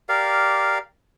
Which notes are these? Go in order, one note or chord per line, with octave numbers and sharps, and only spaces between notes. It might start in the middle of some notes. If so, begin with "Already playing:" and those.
G4 A#4 D5 F5